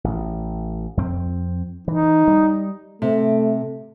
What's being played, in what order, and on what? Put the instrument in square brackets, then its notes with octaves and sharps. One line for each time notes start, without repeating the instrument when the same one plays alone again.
[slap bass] A1
F2 C4
[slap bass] E3 [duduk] D#4
[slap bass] G3
[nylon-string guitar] C3 [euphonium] A3